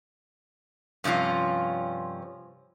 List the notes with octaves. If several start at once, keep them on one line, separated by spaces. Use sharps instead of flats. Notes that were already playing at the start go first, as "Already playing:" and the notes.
G2 C3 F3 C#4 F4